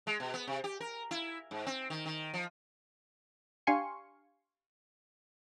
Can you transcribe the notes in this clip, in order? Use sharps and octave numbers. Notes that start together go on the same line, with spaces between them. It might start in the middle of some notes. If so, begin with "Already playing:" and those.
G#3
B2
B3
C3
G4
A#4
E4
G#2
C4
D#3
D#3
F3
D4 G4 F5 G#5 C6 C#6